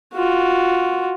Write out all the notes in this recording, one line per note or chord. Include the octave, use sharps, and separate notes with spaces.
F4 F#4